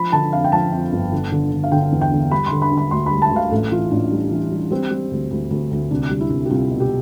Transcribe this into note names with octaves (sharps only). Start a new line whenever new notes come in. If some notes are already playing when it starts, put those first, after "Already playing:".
Already playing: F3 B5
D3 A5
F2 F5
G5
F3 A5
F2
G1
D3
D3
D3
F5
D3 G5
E2
G5
D3
G3 B5
C6
D3
B5
D3
B5
D2 C6
B5
G3
A5
D2 F5
A1 A4
E3 F4
A1 D4
G3
E3
G3
G3 C4
G3
D2
D2
D2
D2
C2 D4
G3
E4
C2
G4
C2 F4
B2
G4